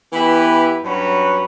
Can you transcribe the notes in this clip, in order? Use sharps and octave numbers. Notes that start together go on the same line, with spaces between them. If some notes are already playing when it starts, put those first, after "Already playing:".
E3 B3 E4 G4 B4
G2 F#3 C#4 F#4 B4